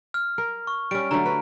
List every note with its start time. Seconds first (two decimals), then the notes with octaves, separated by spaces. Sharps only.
0.14 F6
0.38 A#4
0.67 C#6
0.91 G3 C#4 D7
1.11 D3 F#3 A3 A#5
1.26 B4